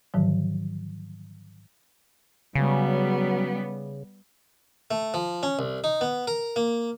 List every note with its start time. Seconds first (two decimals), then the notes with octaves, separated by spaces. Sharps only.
0.14 G#2 D3 D#3 F3 F#3
2.55 C#3 F#3 G3 B3
4.91 A3
5.14 F3
5.43 C#4
5.59 C2
5.84 D#4
6.01 B3
6.27 A#4
6.56 A#3